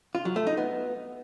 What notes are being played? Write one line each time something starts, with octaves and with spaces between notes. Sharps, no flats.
F4
F#3
A3
D#4
B3